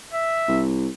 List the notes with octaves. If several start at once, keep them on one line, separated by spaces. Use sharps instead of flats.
E5
C2